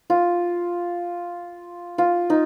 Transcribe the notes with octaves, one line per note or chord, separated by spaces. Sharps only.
F4
F4
D#4